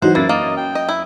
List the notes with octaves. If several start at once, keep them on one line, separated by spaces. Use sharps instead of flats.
E3 F#3 D#4 C5 F#5
F#2 A#3 E4 A6
A#3 D#5
G5
D#5
E4